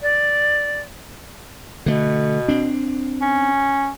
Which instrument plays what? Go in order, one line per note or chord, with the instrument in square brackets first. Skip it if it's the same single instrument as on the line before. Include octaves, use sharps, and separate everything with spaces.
[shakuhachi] D5
[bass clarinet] B2 [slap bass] D3 A3
[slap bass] C4 D4
[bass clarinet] C#4